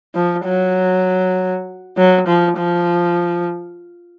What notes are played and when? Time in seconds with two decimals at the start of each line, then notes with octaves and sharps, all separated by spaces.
0.15 F3
0.46 F#3
1.97 F#3
2.27 F3
2.59 F3